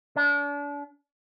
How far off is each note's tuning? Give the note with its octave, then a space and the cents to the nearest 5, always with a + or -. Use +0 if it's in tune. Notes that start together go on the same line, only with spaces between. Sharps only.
D4 -35